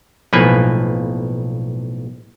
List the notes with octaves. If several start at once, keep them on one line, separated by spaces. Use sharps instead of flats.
B1 A2 F3 A#3 B4 G#5